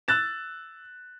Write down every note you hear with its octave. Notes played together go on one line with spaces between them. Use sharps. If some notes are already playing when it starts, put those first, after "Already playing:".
E6 F#6 A6 E7